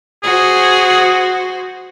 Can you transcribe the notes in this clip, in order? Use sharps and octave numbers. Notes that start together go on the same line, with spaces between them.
F#4 G#4 C5